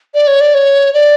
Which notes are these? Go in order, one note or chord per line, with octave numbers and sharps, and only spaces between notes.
D5
C#5
D5
C#5
D5